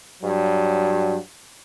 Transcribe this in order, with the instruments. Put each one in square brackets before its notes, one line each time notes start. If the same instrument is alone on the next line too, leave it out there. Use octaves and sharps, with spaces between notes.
[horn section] G2 F#3